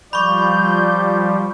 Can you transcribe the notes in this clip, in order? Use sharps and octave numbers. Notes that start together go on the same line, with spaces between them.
F3 G3 D5 B5 C#6 G6